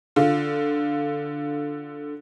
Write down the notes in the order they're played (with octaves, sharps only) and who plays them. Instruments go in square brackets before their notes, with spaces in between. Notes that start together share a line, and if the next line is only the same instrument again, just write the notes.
[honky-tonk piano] D3 F4